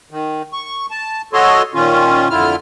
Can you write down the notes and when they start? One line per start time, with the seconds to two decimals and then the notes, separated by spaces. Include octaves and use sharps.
0.11 D#3
0.53 C#6
0.91 A5
1.33 F#4 A4 C#5 D#5 C6
1.75 A#2 D#3 C#4 F4
2.30 F2 D3 E4 F4 F6